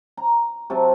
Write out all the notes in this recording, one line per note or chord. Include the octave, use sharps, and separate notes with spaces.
A#5
C3 F#3 A5